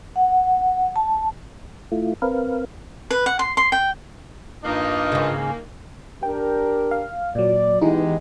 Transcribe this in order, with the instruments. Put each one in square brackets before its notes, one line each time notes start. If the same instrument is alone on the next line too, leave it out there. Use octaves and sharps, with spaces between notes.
[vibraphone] F#5
A5
[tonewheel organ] A3 E4 F4
C4 A#4 B4 F5
[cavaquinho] B4
F#5
C6
C6
G5
[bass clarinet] G2 [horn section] D#3 A#3 [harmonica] D#4 F4 D#5
[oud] G#2 C#3
[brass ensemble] D4 G4 A#4 [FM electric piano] G5
[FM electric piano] F5
[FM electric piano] A#2 F#3 [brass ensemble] D5
[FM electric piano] E3 D#4 [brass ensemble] G#3 B3 G4